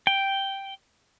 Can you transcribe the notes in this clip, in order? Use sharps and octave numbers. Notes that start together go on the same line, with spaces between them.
G5